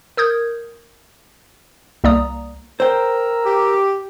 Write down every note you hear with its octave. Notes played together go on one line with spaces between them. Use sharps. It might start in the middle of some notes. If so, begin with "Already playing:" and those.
A#4 D#6 G6 G#6
C2 A#3 D5 A#5 D#6
A#4 C5 G5 A#5 E6
G4